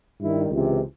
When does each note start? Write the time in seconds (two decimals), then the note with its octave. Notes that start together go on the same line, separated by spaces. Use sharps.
0.21 G2 D#3 G3 E4
0.51 C#2 C3 E3